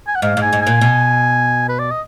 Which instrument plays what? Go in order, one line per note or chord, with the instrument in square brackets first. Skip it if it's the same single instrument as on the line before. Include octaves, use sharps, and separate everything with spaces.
[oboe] G#5
F#5
[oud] G#2 [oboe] F5
[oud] G#2
[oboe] G#5
[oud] G#2
[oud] A#2 [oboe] G#5
[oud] B2
[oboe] B4
D5
D#5